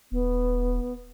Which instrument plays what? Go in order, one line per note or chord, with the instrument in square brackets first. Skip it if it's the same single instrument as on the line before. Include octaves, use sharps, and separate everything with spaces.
[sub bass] D#1 [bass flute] B3